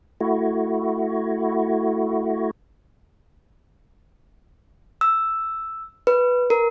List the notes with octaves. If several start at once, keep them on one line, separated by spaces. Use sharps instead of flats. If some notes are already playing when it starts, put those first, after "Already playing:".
A3 E4 F#4
E6
B4
A#4